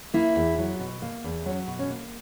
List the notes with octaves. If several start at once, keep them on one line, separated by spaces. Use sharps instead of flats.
A#3 E4
E2
F#3
B2
A#3
E2
F#3 C#4
B2
C#4
A#3